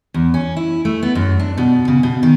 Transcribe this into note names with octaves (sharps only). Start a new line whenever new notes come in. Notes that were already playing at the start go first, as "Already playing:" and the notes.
E2
C#4
E4
A3
B3
F#2
D4
B2
C#3
B2
D#3